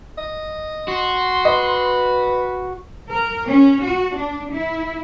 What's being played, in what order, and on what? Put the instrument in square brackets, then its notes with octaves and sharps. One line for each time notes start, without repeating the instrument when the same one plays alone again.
[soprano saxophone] D#5
[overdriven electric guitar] F#4 [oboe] C6
[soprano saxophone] B4 [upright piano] D#5
[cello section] A#4
C#4
F#4
D4
E4